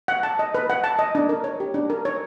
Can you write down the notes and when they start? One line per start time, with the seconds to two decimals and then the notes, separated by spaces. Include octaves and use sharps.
0.08 F#5
0.23 A5
0.39 D#5
0.55 B4
0.70 F#5
0.84 A5
0.99 D#5
1.15 D4
1.29 A#4
1.44 C#5
1.60 G4
1.74 D4
1.90 A#4
2.05 C#5